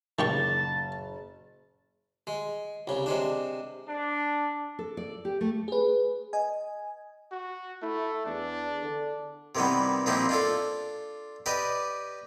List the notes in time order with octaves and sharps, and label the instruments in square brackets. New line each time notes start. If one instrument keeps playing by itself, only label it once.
[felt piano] F#1 A6 [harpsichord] D#3 G4 C#6 [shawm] A5
[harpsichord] G#3
C2 C#3
C3 G#3 D4
[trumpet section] D4
[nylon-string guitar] A4
D5
G4
A3
[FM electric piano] G#4 B4
D#5 G#5
[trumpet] F#4
[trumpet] A3 [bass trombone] E4
[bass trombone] E2 [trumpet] D4
[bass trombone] D3
[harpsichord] C3 D#3 E3 G3 B3
A#2 F3 C4 D#4 E4 G4
D4 F4 A4
G4 B4 D5 D#5